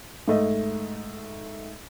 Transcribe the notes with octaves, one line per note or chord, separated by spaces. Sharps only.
G#2 A3 D#5